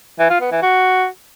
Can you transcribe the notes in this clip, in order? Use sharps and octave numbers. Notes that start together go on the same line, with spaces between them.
E3
F4
B3
E3
F#4